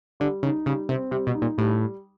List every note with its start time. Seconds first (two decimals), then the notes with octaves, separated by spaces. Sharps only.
0.20 D3 G3
0.43 C#3 D#4
0.66 C#3 G3
0.89 C3 C4
1.11 C3 G3
1.27 B2
1.35 D#4
1.42 A#2
1.58 A2 G3